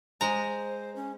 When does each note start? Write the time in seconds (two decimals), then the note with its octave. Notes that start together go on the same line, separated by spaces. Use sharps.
0.21 G#3 C5 A#5
0.96 C#4